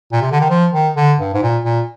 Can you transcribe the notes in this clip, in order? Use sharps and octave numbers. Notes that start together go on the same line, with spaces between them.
A#2
C3
D3
D#3
F3
D#3
D3
G2
G#2
A#2
A#2